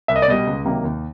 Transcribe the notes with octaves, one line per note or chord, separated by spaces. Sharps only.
C2 E5
D#5
D5
B2 G3 D#5
C#2
C3 D#3 F#3 A#3
D#2